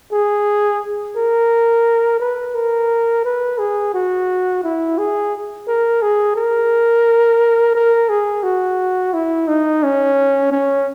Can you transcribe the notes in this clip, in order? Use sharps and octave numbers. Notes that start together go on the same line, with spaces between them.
G#4
A#4
B4
A#4
B4
G#4
F#4
E4
G#4
A#4
G#4
A#4
A#4
G#4
F#4
E4
D#4
C#4
C#4